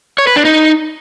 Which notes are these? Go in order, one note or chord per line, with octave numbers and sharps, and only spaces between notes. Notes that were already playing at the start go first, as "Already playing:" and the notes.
C#5
B4
D4
D#4